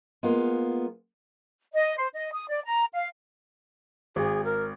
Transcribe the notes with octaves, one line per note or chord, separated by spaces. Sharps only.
G#3 A#3 B3 F4
D#5
C5
D#5
D#6
D5
A#5
F5
G#1 G#4
A#4